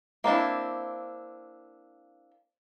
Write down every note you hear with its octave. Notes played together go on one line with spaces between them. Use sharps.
A#3 C4 D4 E4